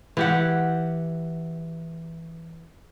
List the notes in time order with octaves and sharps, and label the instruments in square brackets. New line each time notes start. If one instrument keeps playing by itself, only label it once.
[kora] E3 G4 F#5